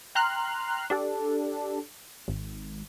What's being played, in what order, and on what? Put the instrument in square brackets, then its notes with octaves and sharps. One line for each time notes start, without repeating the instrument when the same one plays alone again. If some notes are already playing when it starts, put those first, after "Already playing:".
[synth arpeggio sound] G5 A#5 C6 F6 F#6
D4 G4 A4
G#1